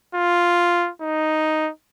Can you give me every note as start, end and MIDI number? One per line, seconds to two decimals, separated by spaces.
0.15 0.90 65
1.01 1.70 63